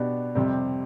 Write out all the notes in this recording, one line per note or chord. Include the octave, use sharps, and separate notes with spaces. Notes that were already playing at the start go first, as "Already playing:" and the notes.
Already playing: B2 B3 D4 G4
F2 C3 G3 C4 G4